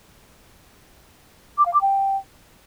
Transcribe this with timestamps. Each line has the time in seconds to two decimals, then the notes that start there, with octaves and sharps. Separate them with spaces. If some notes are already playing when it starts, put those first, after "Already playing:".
1.58 D6
1.66 F5
1.74 D6
1.82 G5